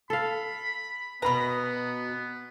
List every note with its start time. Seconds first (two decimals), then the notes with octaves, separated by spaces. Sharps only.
0.10 A4 F5 B5
1.22 B2 B3 B4 A#5 B5